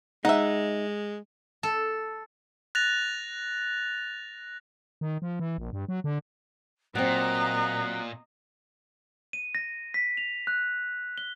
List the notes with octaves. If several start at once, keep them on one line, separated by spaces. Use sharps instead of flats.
G#3 D#4 E5 F#5
A4
F#6 A6 A#6 F7
D#3
F3
E3
A#1
G2
F#3
D3
A#2 F#3 C4 D#5 A#5 F#6
D#7
A#6
B6
F7
F#6
G7